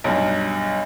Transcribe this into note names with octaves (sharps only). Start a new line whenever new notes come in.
B1 G2